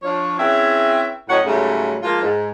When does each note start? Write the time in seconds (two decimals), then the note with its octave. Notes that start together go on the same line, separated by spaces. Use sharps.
0.03 F3 D4 C#5
0.38 C4 C#4 E4 G#4 B4 E5
1.29 A2 F#3 C#4 C#5 D#5 F#5
1.46 G#2 C#3 F#3 G3 A3
2.03 F3 G#3 A#3 F4
2.22 G#2